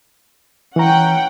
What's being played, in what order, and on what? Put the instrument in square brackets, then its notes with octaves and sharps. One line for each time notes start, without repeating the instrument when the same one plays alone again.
[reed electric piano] E3 A#5 [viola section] C#4 F#5 G5